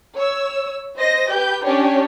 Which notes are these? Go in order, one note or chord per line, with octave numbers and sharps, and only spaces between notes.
C#5 E6
C5 D#5 A#6
G4 B4 G6
C#4 D4 G4 C#5